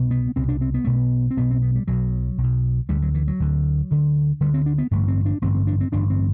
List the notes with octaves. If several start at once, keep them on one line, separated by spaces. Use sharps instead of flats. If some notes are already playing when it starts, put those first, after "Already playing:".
Already playing: C2 B2
B3
C2 B2 C4
D4
C4
B3
B1 B2 A3
B3
C4
B1 B2 B3
C4
B3
G3
B1 B2 F#3
B1
B2
D2 D3 G3
F#3
E3
F#3
D2 D3
D2 D3
D2 D3 G3
C4
D4
B3
A1 G2 D3 A3
C4
D4
A1 G2 D3 C4
C4
D4
C4
A1 G2 D3 D4
C4